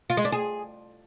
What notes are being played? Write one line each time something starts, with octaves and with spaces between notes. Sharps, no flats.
F4
G#3
D4
G#4